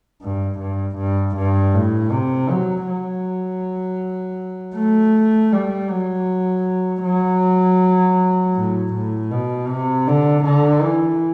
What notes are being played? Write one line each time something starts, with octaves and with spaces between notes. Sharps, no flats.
G2
G2
G2
G2
A2
C3
F#3
F#3
A3
G3
F#3
F#3
A2
A2
B2
C3
D3
D3
E3